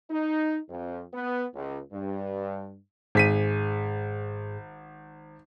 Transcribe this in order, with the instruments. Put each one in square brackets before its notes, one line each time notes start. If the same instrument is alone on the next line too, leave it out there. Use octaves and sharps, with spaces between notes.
[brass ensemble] D#4
F2
B3
C#2
G2
[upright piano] G#1 B6 D#7 [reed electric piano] G#2 G#4